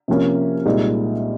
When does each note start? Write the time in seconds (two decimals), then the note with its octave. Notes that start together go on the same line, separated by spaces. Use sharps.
0.08 C3 F3 A#3 C#4
0.65 C2 A#2 G#3 D#4